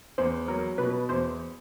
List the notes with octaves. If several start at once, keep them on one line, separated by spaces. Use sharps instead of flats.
E2 C5
F#3 A#4
B2 B4
E2 C5